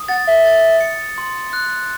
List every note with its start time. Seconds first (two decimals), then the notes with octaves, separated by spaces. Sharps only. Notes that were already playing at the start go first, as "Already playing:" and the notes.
Already playing: D#6
0.08 F#5 A6
0.27 E5
0.45 A6
0.81 C#7
1.18 C6
1.53 F#6